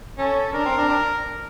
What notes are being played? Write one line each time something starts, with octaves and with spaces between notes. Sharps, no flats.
C#4 A4
D4 A#4
C4
D4
D4